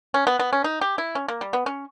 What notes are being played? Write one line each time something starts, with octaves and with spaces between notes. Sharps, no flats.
C#4
B3
B3
C#4
D#4
G4
E4
C#4
A#3
G3
B3
C#4